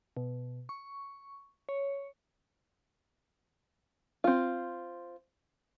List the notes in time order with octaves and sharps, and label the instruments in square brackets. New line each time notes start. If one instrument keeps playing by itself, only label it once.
[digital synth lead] B2
C#6
C#5
[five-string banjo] C4 F4